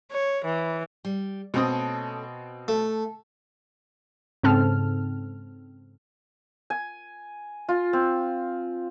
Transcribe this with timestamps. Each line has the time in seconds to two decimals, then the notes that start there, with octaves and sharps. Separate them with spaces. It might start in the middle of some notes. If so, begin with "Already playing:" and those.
0.12 C#5
0.45 E3
1.05 G3
1.54 B2 A3 C4 C#4 A4 D#6
2.68 A3 A4
4.43 G#2 C#3 C4 A4 A5 F6
6.70 G#5
7.69 F4
7.93 C4